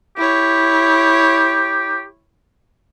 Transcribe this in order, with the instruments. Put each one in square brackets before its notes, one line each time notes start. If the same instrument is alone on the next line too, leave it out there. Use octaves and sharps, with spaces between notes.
[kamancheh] E4 C#5 [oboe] G4